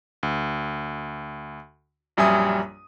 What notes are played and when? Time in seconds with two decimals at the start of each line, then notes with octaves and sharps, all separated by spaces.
0.23 D2
2.17 A#1 F#2 G3 E5 G#5 D#6